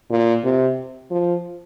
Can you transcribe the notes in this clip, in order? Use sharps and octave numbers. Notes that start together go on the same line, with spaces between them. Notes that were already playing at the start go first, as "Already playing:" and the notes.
A#2
C3
F3